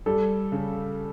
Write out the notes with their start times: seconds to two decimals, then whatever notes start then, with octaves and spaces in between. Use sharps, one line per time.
0.06 G3 A4
0.52 C#3